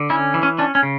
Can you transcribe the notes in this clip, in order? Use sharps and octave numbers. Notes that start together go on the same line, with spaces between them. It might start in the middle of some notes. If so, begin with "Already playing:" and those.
Already playing: D3
C#4 E4
E3
C#4
C#4 D4
C#4
C#3